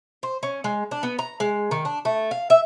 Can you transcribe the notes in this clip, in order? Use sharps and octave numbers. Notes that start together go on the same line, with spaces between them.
C5
C#4
G#3
D4
B3
A#5
G#3
D#3
D4
A3
F5
E5